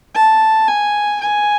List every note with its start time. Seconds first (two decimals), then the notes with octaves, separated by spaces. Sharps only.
0.15 A5
0.68 G#5
1.21 G#5